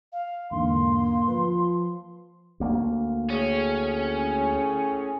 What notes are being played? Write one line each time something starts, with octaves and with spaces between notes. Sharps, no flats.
F5
E2 G#2 D3 A#3 C6
F3 B4
D2 A#3
A2 C#4 G#4